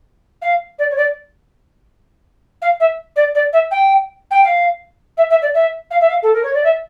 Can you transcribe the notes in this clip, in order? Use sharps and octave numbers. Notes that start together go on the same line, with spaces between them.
F5
D5
C#5
D5
F5
E5
D5
D5
E5
G5
G5
F5
E5
E5
D5
E5
F5
E5
F5
A4
A#4
C#5
D5
E5